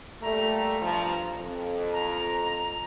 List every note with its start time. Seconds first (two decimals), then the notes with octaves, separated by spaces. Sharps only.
0.22 A#2 G3 A3 A#5
0.81 G2 F3
1.36 F2
1.93 A#5